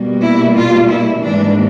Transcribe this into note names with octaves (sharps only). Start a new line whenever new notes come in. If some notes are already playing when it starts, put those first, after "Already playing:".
Already playing: B2 G3 A#3
E4
F4
E4
G#2 E3 G3 A#3 D4